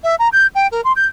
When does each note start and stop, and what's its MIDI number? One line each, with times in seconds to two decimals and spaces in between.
0.04 0.15 76
0.19 0.29 82
0.33 0.47 91
0.55 0.67 79
0.72 0.81 70
0.84 0.92 84
0.96 1.06 91